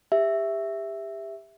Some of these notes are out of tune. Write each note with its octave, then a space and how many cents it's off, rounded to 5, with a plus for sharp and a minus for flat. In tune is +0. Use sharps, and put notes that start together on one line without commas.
G4 +30 E5 +0